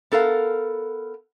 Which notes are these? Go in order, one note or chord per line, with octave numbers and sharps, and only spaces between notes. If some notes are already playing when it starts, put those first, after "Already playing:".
B3 A4 A#4 F5